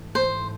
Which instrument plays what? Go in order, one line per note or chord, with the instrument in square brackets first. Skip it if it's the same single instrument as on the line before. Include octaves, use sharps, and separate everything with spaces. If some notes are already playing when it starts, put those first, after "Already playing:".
Already playing: [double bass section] G#2 E3 A3
[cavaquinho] C5